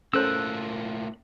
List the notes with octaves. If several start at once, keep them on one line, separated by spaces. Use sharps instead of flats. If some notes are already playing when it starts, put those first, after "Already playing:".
A2 A#3 C#4 A4 C5 E6 F#6